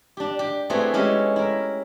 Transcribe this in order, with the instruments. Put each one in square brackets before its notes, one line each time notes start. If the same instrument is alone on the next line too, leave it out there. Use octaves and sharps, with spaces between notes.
[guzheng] D4 G4
G4
A3 B3 C4 E4 F#4 G#4
G#3 A3 C#4 E4 G4
E4 A#4